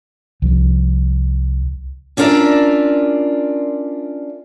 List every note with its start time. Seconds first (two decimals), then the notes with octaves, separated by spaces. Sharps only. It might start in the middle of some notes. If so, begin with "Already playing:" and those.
0.42 C2 F3
2.17 C#4 D4 F4 A#4 D5 E5